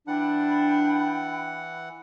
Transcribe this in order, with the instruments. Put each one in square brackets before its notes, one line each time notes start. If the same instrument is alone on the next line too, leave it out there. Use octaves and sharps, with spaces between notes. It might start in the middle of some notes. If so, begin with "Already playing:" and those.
[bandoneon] E3 F#5 [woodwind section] D4 [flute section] G5 B5